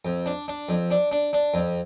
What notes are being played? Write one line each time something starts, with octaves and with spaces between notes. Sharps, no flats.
F2
D4
D4
F2
D4
D4
D4
F2